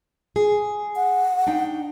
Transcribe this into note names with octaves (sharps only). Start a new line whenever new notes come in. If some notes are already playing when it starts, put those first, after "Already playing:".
G#4
F#5
D4 D#4 G5